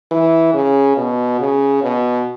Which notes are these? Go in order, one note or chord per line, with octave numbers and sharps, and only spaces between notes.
E3
C#3
B2
C#3
B2